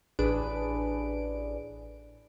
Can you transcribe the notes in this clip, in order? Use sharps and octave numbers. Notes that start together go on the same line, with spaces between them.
A1 D4 G#4 B4 D7